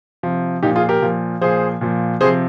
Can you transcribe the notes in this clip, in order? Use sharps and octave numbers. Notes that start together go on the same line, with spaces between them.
C3 F3
A#2 F3 D#4 G4
F4 G#4
G4 A#4
A#2 F3
A#2 F3 G#4 C5
A#2 F3
C3 F3 G#4 C5